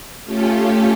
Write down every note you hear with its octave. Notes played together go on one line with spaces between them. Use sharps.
A3 C#4 F4 G4 A4